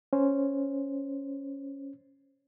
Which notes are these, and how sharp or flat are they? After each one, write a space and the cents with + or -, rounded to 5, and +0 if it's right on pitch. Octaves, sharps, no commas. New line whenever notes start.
C#4 +0 C5 +0